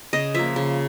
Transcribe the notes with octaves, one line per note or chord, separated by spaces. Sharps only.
C#3 D#5
F3 A#3 E5
C#3